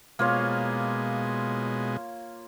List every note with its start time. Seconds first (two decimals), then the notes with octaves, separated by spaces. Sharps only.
0.19 B2 G#3 A#3 F4 C#5